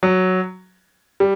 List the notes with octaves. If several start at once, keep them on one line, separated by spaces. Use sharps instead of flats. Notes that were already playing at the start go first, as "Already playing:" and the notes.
F#3
G3